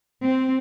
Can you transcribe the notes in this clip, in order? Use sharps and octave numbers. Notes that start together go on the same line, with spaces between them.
C4